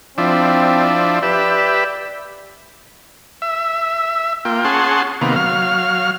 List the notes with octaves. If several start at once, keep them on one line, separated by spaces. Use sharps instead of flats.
F3 C4 D4 E4
G4 B4 D5 E5
E5
A#3 F4 G5
C#4 G#4 F#5 A5 C6
C3 D#3 A#3 B3 F5
F#3 F5 F6